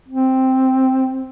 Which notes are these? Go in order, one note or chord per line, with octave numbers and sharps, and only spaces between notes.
C4